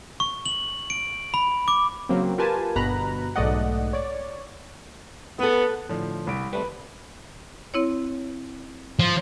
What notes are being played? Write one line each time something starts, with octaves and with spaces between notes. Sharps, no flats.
C#6
F#7
D7
B5
D6
C#3 F#3 A#3 C4
F4 G4 A#4 B4 G#5 A5
G1 G2 B2 A#5 B5 F#6
B1 G#2 A3 D5 D#5 F#5
C#5 D5
B3 A4 B4
A2 D3 F3
C2 D7
G3 A3 C4 B4
C4 E4 C#5
F3